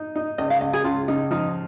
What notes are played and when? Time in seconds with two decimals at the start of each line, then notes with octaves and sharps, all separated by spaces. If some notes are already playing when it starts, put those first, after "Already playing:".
Already playing: D#4
0.16 D#4
0.38 C#2 D#5
0.50 F5
0.61 C#2 D#5
0.73 G#4
0.84 C#2 F4
1.08 C#3 D#4
1.31 F3 D#4